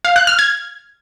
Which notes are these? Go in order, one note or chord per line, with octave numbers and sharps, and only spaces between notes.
F5
F#6
F6
G#6